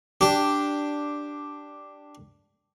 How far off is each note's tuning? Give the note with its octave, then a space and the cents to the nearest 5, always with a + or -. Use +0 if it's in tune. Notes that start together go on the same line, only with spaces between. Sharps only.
D4 +0 G4 +0